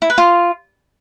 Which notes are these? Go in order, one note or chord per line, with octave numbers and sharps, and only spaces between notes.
E4
B4
F4